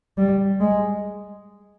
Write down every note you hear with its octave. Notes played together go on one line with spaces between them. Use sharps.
G3
G#3